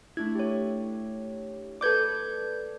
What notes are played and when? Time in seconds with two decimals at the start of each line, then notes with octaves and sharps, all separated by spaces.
0.17 A3 D4 E4 G#6
0.35 G4 C#5
1.81 A4 B4 D5 D6 G6 G#6